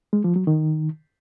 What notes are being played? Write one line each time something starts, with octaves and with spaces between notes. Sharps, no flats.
G#3
F3
F#3
D#3